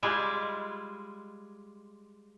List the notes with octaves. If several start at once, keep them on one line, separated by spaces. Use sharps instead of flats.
G3 G#3 E4 F4